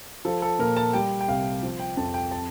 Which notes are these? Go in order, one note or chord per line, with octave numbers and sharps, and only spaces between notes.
F3 A4
A4
A#2 A#4
A5
G3 G5
G5
C2 F5
F3
G5
F2 A5
G5
A5